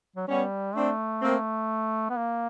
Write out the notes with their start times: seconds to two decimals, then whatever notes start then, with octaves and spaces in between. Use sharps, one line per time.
0.16 F#3
0.28 G3 B3 C#4
0.75 A3 C4 D4
1.22 A#3 C4
2.10 B3
2.16 A#3